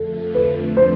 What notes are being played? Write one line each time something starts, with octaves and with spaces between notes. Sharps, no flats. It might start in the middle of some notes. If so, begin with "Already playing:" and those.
Already playing: F2 D3 F3 A3 A4
B4
C5